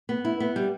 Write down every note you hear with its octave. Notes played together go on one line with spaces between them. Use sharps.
B3
E4
B3
G3